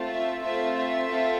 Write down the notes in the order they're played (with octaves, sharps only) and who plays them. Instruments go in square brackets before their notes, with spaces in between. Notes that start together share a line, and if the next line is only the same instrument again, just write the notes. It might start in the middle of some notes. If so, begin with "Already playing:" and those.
Already playing: [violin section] A3 C4 F4 A4
E5
A3 C4 F4 A4 E5
E5
C4 F4 A4